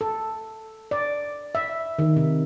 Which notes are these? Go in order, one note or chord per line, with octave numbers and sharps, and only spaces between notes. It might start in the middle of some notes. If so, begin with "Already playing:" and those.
A4
D5
E5
D#3
C3